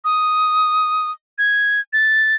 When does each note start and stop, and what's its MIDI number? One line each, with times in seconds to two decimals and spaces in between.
0.05 1.11 87
1.38 1.80 92
1.93 2.35 93